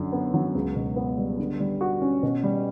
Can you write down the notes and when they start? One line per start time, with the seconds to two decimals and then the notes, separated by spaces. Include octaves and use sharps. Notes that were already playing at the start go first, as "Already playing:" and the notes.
Already playing: F#2 D3
0.12 B3
0.34 F#3
0.55 C#2
0.76 B2
0.96 B3
1.18 G3
1.39 D3
1.60 G3
1.81 F#4
2.01 C#4
2.23 B2
2.44 G3